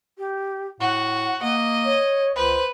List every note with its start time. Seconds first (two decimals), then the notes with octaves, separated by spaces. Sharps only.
0.18 G4
0.80 A2 F#4 F#5
1.42 A#3 D#5
1.84 C#5
2.35 C#2 B4 C5